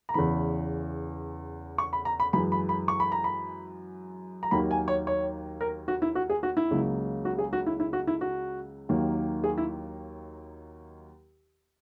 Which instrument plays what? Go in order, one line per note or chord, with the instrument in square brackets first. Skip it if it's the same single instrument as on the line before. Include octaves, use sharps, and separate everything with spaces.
[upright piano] A#5
E2 C#3 E3 B5
C#6
B5
A#5
B5
F#2 E3 G#3 B5
B5
B5
C#6
B5
A#5
B5
A#5
D#2 D#3 F#3 A#3 B5
G#5
C#5
C#5
A#4
F#4
E4
F#4
G#4
F#4
E4
C#2 C#3 F#3 A#3
F#4
G#4
F#4
E4
E4
F#4
E4
F#4
D#2 D#3 F#3 A#3
G#4
E4